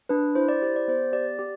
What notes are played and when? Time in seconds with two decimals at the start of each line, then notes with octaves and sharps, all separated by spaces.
0.09 D4 B4
0.35 E4 C5
0.49 D5
0.62 G4 C5
0.76 D5
0.88 B3 C5
1.13 G4 D5
1.39 G4